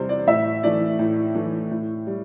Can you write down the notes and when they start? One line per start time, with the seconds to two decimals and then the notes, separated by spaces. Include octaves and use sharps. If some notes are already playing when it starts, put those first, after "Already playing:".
Already playing: E2 C3 G3 C5
0.09 D5
0.27 A2 E5
0.63 E3 A3 D5
0.99 A2
1.35 E3 A3
1.71 A2
2.07 G3